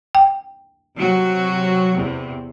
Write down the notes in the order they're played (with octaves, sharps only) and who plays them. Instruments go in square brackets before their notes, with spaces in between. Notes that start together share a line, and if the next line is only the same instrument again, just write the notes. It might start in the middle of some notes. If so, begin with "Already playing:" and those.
[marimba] G5
[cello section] C3 F#3 F#4
E2 C3